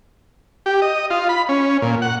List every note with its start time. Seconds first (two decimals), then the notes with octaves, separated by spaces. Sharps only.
0.66 G4
0.82 D#5
1.10 F4
1.29 B5
1.49 C#4
1.82 A#2
2.02 F#5